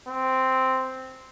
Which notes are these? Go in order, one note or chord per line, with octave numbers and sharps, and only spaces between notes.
C4